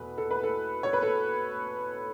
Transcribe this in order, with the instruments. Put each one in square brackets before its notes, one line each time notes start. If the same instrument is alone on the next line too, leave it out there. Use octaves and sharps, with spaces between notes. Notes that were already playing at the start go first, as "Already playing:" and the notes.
Already playing: [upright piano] E2 B2 A3 B4
A4
B4
A4
C#5
B4
A4